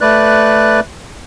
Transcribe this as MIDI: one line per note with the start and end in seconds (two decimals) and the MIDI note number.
0.01 0.80 57
0.01 0.80 71
0.01 0.80 74
0.01 0.80 90